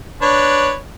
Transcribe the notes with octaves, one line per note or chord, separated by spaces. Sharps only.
D4 B4 C#5